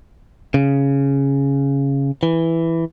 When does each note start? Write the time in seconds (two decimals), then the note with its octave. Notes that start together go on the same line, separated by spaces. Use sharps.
0.54 C#3
2.23 E3